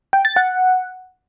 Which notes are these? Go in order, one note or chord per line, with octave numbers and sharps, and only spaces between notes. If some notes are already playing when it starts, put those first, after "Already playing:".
G5
A6
F#5